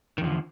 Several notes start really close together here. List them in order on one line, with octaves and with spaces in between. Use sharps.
D#3 E2 F3 D3